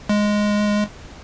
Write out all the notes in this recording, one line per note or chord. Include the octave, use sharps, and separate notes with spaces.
G#3